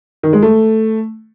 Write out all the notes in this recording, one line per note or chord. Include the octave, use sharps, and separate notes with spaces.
D#3
G#3
A3